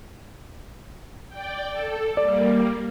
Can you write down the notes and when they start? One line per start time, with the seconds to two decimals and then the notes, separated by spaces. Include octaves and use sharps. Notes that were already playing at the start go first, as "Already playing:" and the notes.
1.29 D5 G5
1.71 A4
2.17 G3 A#3 D5